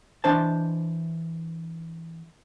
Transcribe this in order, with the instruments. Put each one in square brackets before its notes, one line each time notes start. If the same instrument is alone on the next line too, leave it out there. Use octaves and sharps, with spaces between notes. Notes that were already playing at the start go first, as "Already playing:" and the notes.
[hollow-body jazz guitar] E3 D4 C5 A5